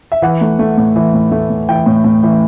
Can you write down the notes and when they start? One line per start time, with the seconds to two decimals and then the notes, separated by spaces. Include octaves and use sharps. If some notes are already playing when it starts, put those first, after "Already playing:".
0.12 E5
0.22 E3 F#5
0.41 A3
0.59 A3
0.77 A2
0.96 E3
1.14 A2
1.32 A3
1.50 A2
1.68 E3 G5
1.86 A2
2.04 A2
2.23 E3